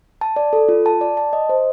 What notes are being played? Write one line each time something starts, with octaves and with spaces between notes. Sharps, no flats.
A5
D5
A4
F4
A5
D5
A5
D#5
C5